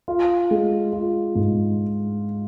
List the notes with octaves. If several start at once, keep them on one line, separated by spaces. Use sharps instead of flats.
F4
G#3
F4
G#2